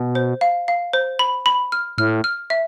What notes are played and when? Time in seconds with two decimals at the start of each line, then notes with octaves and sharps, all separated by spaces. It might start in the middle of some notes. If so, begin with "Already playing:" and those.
Already playing: B2
0.15 C5
0.41 F5
0.68 F5
0.93 C5
1.19 B5
1.46 B5
1.72 F6
1.98 A2 F6
2.24 F6
2.50 E5